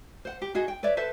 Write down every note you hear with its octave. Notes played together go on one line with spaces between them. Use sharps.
C5 F#5
G4
D#4 F#4 G#4 D#5
G5
B4 C#5 D5 E5
A4 B4 C5 E5